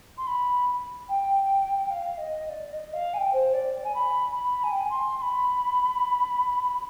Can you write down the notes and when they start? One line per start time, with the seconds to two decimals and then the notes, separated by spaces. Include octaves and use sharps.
0.18 C6
0.27 B5
1.09 G5
1.90 F5
2.18 D#5
2.45 D#5
2.49 D5
2.72 D#5
2.93 F5
3.14 G#5
3.18 G5
3.33 C5
3.54 D5
3.84 G#5
3.94 B5
4.35 B5
4.64 G#5
4.71 G5
4.80 G#5
4.90 C6
5.17 C6
5.22 B5